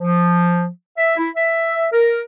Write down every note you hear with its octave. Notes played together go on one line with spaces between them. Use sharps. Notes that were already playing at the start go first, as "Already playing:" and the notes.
F3
E5
E4
E5
A#4